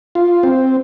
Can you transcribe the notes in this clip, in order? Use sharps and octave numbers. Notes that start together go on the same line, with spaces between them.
F4
C4